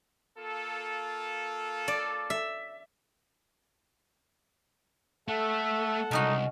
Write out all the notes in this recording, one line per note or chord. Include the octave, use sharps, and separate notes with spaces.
A#3 F4 A4
D5
E5
A3 A4 E5 F#5
C2 C#3 G#3 D#4 F#4